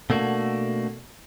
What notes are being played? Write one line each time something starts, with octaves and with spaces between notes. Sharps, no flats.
B2 A3 A#3 D4 F#4